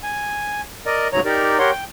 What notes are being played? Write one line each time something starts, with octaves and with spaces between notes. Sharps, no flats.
G#5
A#4 D5 D#5
D2 G#2 C#3 F#3 C#5 A#5
D#4 G4 A#4 D5
G4 A#4 C#5 F#5 C6
G5